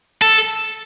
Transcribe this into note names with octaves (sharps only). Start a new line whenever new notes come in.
A4